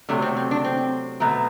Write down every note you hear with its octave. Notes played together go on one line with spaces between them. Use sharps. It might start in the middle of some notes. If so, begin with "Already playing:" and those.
C3 F#3 A3 D4
C4
C4
D4
C4
B2 F#3 A3